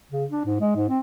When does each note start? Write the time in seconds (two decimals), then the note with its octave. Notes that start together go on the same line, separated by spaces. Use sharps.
0.12 C#3
0.30 D4
0.45 G#2
0.61 G#3
0.76 G#2
0.89 C4